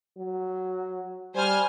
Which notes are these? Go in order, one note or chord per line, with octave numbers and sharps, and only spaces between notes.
F#3
G3 C5 G#5 F6